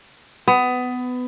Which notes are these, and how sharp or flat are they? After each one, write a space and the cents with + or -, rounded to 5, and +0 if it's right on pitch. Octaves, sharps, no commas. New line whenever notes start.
B3 +20